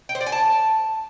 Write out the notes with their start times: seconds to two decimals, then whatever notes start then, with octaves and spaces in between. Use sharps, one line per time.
0.09 G5
0.15 C5
0.21 D5
0.26 G#5
0.32 A5